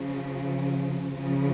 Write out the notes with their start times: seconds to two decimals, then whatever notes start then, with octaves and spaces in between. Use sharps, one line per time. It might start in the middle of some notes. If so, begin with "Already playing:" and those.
Already playing: C#3 F3
1.13 C#3 F3